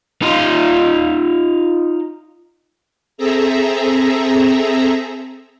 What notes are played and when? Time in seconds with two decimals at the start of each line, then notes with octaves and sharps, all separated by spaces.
0.22 D#4 F4
3.18 C4 G#4 A4 E5 A#5